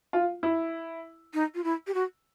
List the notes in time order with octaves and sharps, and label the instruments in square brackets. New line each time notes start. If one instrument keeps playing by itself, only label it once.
[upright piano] F4
E4
[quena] D#4
F4
E4
G4
F#4